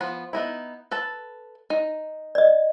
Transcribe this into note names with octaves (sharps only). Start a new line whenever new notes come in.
F3 B3 F#5
B3 D#4 E4
A4 B4 A5
D#4
D5 D#5